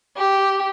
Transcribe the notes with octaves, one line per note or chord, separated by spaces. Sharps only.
G4